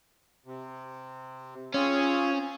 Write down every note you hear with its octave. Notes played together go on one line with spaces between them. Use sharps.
C3
C4 C#4 F4 G#4